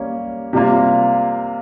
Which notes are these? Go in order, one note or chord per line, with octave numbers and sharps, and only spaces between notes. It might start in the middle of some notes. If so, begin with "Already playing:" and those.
Already playing: G3 A#3 C#4
C3 G3 A#3 F4